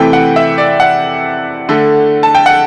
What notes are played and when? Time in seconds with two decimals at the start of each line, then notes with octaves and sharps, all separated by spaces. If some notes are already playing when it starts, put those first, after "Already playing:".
Already playing: C3 E3 A3 G5
0.13 F#5
0.36 E5
0.58 D5
0.80 F#5
1.69 D3 A3
2.23 A5
2.35 G5
2.46 F#5